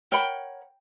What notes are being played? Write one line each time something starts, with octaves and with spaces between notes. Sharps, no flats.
A#4 C#5 F#5 G5 B5